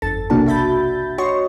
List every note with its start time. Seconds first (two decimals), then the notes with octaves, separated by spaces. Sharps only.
0.02 G1 F2 A4 A6
0.30 B1 C3 A#3 D4 F#4 A5
0.46 F#4 E5 B5 G6 A6
1.18 F#4 C#5 D#5 C6 C#6